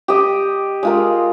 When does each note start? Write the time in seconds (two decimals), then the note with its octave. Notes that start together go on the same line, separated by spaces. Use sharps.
0.08 G4 D#5
0.83 G#3 F4 A#4